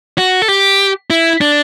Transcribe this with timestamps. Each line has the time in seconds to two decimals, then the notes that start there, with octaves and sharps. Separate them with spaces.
0.18 F#4
0.42 A4
0.48 G4
1.10 E4
1.41 D4